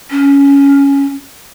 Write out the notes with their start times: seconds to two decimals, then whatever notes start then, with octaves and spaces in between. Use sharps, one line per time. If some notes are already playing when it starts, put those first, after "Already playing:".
0.11 C#4